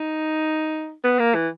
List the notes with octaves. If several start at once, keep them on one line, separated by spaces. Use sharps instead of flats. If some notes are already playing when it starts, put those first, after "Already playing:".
Already playing: D#4
B3
A#3
E3